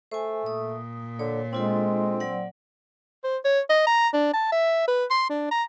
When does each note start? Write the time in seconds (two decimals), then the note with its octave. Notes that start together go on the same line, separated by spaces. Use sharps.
0.12 A3 C5 G#5
0.46 A#2 D#6
1.19 D3 C#5
1.53 G#3 C4 D4 F4 A4
2.20 F#3 D5 F#5
3.24 C5
3.45 C#5
3.70 D#5
3.87 A#5
4.13 D4
4.33 A5
4.52 E5
4.88 B4
5.10 C6
5.30 D4
5.51 A#5